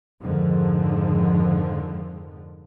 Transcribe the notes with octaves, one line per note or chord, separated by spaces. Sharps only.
F2 G#2 D3 D#3 F3